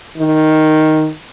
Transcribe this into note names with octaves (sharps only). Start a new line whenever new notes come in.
D#3